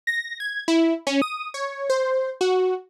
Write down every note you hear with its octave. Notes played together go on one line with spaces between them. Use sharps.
A#6
G#6
E4
C#4
D#6
C#5
C5
F#4